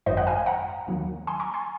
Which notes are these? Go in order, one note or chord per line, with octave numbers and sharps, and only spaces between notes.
G#1 F#2 D#3 C5 D#5
D#5 F#5
F5 G#5
F#5 A#5
D#2 D#3 F#3 A#3
G#5 C6
A#5 C#6
G#5 C6